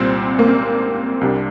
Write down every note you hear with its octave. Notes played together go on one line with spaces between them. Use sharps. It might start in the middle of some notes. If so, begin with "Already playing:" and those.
Already playing: C2 A#2 G3 C4
A#3
C4
C2 C3 G3 D4